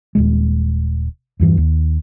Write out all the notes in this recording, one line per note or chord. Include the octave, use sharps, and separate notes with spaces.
D#1 E2 G#3
E2 G2 E3
D#2